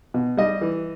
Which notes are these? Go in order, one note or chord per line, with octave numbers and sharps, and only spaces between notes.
B2
G3 D#5
E3